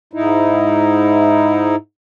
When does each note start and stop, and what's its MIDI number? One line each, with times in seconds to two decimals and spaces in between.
0.13 1.76 44
0.13 1.76 63
0.13 1.76 64